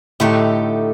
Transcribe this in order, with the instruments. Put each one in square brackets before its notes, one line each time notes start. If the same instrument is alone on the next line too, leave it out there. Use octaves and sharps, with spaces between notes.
[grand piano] A2 [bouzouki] D3 A3 D#4 G4